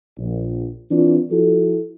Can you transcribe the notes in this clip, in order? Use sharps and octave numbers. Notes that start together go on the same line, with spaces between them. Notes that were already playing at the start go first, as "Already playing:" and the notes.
A#1
E3 C4 D4 F4
F3 E4 F#4 A4